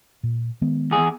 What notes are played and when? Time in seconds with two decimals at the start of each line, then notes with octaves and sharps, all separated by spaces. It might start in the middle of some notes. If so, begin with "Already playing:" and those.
0.23 A#2
0.61 D#3 G#3 B3
0.91 E2 G#4